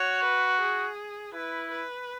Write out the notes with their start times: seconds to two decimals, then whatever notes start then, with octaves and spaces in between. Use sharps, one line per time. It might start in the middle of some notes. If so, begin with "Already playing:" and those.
Already playing: F#4 C#5
0.24 B4
0.60 G#4
1.34 E4 B4
1.71 B4